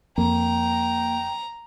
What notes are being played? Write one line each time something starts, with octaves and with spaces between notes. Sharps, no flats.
F2 A#3 G5 A#5